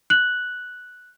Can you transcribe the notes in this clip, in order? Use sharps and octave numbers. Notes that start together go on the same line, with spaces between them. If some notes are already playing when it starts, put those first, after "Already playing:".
F#6 F#7